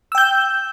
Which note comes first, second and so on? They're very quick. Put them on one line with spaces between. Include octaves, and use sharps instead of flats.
E6 G5 G6